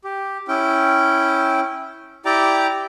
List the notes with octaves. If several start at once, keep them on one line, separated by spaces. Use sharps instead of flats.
G4
C#4 E4 G5
E4 G4 D5 G5 A#5 D6